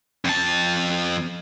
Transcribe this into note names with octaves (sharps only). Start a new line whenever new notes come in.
F2 A5